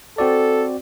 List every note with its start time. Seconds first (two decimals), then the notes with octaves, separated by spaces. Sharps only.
0.18 C4 F#4 A4 D5